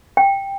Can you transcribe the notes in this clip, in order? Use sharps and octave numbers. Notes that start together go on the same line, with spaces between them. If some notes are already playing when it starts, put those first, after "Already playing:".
G5